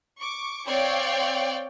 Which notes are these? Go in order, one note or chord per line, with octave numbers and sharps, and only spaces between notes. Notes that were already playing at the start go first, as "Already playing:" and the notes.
C#6 D6
C4 C#5 D5 F5 G5 C7